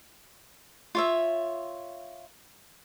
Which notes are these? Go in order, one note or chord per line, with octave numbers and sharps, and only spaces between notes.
F4 C#5 E5